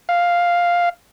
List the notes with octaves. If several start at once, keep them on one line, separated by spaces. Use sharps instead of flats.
F5